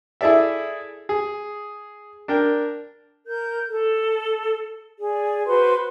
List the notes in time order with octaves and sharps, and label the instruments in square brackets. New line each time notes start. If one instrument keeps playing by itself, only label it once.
[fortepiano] E4 G#4 A4 D5 E5
G#4
D4 A#4 G5
[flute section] A#4 G6
A4
G#4 D5
F#4 B4 C5 C6